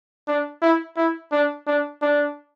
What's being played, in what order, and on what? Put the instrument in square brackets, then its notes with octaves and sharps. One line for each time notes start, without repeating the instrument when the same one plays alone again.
[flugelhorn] D4
E4
E4
D4
D4
D4